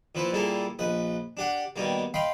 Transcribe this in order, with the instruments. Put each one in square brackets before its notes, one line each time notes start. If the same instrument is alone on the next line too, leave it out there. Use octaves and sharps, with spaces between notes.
[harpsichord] A#2 F3 E4 B4
A#2 G3 A#3 E4 G#4 A4
A#1 B4 D#5
D4 G4 F#5
B2 D#3 G3 A#3
D#5 F5 G5 B5 C6